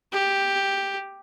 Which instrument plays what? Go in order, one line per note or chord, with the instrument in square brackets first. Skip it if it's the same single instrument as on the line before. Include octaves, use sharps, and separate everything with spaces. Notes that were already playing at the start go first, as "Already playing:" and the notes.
[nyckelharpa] G4